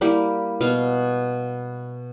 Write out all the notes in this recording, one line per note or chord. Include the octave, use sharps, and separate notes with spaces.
G3 A#3 E4 G4
B2 F5